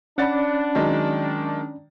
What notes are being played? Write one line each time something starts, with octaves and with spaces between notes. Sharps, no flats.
C#4 D4 D5 F#5 B5 A6
D#3 F#3 G#3